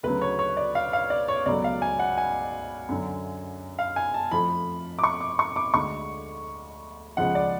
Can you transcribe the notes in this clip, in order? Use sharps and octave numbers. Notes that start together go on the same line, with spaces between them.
D2 C#3 F#3 B4
C#5
C#5
D5
F5
F5
D5
C#5
C#2 B2 F#3 A3 D5
F5
G#5
F#5
G#5
F#2 D3 F#3
F5
G#5
A5
F2 F3 A3 B5
D6
C#6
D6
C#6
D6
D2 D3 G#3 C#6
C#2 C#3 F3 G#3 F#5
D5